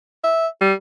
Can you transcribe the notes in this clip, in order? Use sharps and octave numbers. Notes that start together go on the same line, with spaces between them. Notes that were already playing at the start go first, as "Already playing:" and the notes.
E5
G3